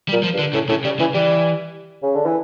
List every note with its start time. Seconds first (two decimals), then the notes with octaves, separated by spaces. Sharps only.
0.08 G3
0.13 A#2
0.23 F3
0.34 G2
0.39 D3
0.53 A2 C#3
0.69 A2 C#3
0.84 C#3 G3
0.99 C#3 E3
1.14 E3 G3
2.03 C#3
2.14 D3
2.26 E3